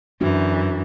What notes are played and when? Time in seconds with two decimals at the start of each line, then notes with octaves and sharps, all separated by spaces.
0.21 F#2 E3 D4 F#4